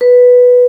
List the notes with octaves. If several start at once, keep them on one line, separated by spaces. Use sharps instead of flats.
B4